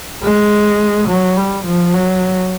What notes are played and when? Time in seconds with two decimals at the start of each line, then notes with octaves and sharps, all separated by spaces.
0.23 G#3
1.08 F#3
1.37 G3
1.65 F3
1.94 F#3